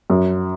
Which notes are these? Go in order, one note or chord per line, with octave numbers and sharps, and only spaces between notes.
F#2